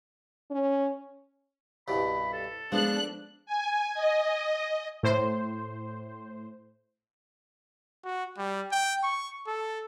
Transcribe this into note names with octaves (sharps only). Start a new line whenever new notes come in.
C#4
C2 G2 B2 B5
A4
F3 G#3 B3 D4 F#6
G#5
D#5
A2 C5
F#4
G3
G5
C#6
A4